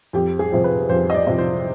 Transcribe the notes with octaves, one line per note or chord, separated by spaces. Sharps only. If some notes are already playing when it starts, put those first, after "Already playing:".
F2 G4
G#4
C3 F3
B4
F2 C5
D#5
D5
C3 F3
C5